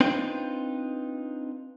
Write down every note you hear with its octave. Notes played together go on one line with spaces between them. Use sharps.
C4 D4 D#4 F4 B4 G5